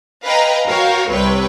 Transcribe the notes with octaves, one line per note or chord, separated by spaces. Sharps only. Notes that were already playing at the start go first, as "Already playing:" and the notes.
B4 D#5 F5 G5 G#5 A#5
F#4 A#4 C#5 F5 G5
C2 C3 C4 B4 C#5 G5